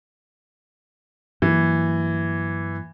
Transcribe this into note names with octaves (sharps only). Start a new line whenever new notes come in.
G2 E3 F#3 A#3